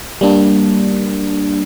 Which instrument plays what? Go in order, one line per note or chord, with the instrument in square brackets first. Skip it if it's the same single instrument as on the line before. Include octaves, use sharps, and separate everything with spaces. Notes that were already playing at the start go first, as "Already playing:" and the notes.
[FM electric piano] G3 A#3 D4